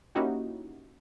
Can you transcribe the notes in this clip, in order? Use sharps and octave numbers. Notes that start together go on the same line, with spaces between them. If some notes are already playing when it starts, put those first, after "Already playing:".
A#3 C#4 D#4 E4 F#4 G4